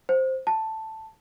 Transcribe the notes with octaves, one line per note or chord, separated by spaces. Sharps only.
C5
A5